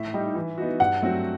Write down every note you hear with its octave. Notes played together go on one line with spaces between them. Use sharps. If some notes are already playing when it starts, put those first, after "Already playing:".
Already playing: A2 E5
G3 D#4 G4
E3
B3 D#4 F#4
G2 F#5
F#3 A3 C4 F#4